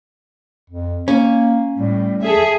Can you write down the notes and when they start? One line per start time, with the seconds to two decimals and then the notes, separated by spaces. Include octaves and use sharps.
0.70 F2
1.08 A#3 C#4
1.77 A2 G3
2.22 G#4 A4 E5